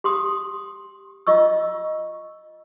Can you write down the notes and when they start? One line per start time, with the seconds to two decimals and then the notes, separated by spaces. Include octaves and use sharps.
0.04 G4 C6 D#6
1.27 F4 D#5 C#6 E6